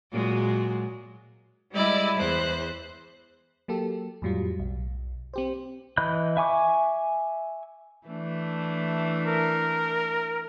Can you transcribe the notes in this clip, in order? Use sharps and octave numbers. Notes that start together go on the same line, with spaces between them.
A#2 F#3 G#3
G3 G#3 E4 D5 D#5
E2 C5 F#6
F#3 A#3 G4 A4
F2 A2 F#3 G3 F4
B1
C4 G4 C5
E3 D#5 B5 F#6 G6
E5 G#5 C#6 D6
E3 A3 D4
A#4